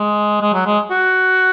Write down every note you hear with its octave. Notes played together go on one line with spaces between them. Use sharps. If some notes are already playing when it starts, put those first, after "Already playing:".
Already playing: G#3
G#3
F#3
G#3
F#4